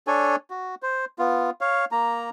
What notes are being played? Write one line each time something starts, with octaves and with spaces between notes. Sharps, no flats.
D4 A4 C#5 G#5
F#4
C5
B3 F4
C#5 F5
A#3 A#5